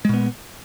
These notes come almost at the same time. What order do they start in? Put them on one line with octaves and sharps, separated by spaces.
G#3 A#2 B3